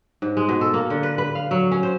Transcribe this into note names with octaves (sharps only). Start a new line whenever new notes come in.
G#2
G#3
B2
A4
A#3
D3
B4
B4
F5
F#3
C#4
C5